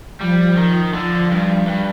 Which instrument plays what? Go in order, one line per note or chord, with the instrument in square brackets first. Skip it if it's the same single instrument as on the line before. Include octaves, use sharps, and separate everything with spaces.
[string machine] F3 [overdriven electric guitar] G3
[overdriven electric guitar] D#3
D3
G2
G2